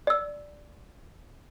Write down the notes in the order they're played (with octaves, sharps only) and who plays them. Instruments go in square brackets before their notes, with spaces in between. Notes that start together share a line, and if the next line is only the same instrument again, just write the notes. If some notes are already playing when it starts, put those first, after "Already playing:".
[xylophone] D5 E6